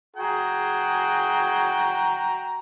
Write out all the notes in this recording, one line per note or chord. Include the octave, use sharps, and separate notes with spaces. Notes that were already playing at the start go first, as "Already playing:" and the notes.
F#4 G#4 G5 A#5